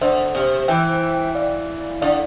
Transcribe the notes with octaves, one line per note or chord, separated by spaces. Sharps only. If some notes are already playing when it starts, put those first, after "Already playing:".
D3 C5 E5
C3
E3 E5 G5
D5 F5
D3 D5 F5